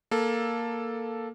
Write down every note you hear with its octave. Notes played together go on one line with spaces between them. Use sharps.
A#3 A4